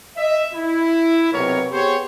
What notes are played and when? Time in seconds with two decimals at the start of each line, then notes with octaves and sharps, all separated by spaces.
0.17 D#5 E5
0.54 E4
1.33 B1 C3 B3 A#4 C#5
1.72 B3 G4 G#4 C5 C#5